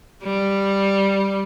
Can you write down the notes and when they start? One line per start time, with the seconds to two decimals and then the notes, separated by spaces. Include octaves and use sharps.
0.23 G3